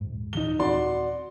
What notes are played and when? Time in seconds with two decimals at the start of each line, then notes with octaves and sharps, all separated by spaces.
0.01 D#1 G#2
0.33 D#1 E3 D#4 G7
0.59 D#1 C4 C#4 F#4 D5 C6